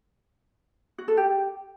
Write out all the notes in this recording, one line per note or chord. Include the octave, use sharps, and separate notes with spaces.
F#4
A4
G4